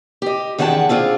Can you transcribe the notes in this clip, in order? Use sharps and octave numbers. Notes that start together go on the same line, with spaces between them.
G4 D#5
E2 D#3 G#4 F#5 G5 A5
C4 D4 F4 G#4